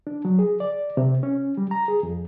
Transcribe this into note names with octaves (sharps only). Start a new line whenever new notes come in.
D4
F#3
G#4
D5
C3
C#4
G3
A#5
G#4
F2